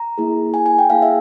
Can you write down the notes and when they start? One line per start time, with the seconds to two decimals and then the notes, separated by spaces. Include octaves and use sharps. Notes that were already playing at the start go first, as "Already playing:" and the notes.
Already playing: A#5
0.18 A#3 E4 G#4
0.54 G#5
0.66 G#5
0.79 G5
0.90 A#3 E4 G#4 F5
1.02 E5